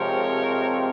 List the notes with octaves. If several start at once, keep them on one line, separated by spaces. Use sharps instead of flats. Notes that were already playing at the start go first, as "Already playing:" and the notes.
Already playing: C3 F3 G#3 C4 A#4 C#5